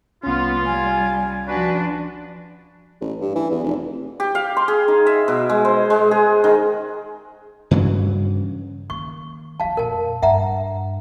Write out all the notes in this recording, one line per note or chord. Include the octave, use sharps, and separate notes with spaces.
C2 B3 C#4 F4
G3 G#5
F3 D4 F#4 B4
A1
G2
E3
E2
F1
G4
F5
C6
G#4
D#4
E5
B2
G#3
C5
G#3
G#4
D#3
G2 C#3 E3 F#3
D#3 A#3 C#6
E3 F3 F5 A5
F2 A#2 A#4 A5
G2 E5 F#5 A#5